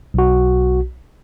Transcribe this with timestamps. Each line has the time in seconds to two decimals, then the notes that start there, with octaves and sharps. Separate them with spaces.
0.14 B1 F#4